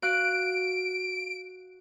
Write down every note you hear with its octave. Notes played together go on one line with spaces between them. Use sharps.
F#4 F5 F#6 D7